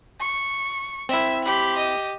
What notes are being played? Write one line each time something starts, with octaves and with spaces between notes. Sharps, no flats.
C#6
C4 E4 E5
G4 B5 C6
D#5